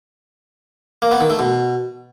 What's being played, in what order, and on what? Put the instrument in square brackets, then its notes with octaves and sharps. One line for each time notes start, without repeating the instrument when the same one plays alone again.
[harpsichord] A#3
B3
D#3
A3
B2